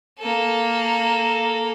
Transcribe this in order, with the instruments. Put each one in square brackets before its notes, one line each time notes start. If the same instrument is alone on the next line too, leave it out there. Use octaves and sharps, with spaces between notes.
[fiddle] A#3 A4